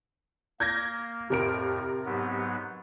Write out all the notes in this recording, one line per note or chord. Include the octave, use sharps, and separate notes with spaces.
A#3 G6 G#6 A#6
F2 A2 C3 A#4 D7
G#2 F#3 B3